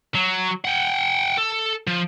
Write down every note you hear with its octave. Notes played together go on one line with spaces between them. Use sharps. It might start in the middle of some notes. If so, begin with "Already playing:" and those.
F#3
F#5 G5
A4
F3